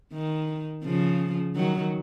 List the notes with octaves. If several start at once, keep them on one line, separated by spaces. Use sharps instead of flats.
D#3
C#3 F3
D#3 F#3